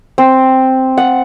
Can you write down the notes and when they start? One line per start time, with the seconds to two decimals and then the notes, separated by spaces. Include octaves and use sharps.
0.18 C4
0.97 F#5